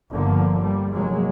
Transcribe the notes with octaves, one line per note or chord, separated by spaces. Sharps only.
G1 D3 F3 A#3
G3
F1 F#3 G#3 A#3